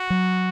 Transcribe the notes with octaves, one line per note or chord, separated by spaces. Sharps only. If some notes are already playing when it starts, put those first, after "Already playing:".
Already playing: F#4
F#3